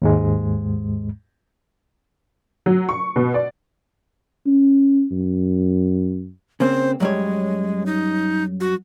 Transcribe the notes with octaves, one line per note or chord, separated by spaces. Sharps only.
D#2 G#2 G#3
F#3
C#6
B2
D5
C#4
F#2
C#3 A#3 C4 C5
F#2 G3 G#3 C#5
D#4
F#4